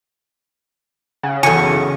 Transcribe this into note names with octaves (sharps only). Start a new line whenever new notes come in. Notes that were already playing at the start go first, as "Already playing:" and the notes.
C#3 F#5
F#1 B1 E2 A4 G#5 C#6